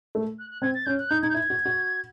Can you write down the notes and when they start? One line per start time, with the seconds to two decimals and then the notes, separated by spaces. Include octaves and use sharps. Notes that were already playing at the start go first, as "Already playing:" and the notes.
0.15 A3
0.39 F#6
0.50 F#6
0.62 C4 G#6
0.74 A6
0.86 C#4 G6
0.99 F#6
1.10 D#4 G6
1.22 D#4 G#6
1.29 G6
1.34 E4 G#6
1.50 F#4
1.65 F#4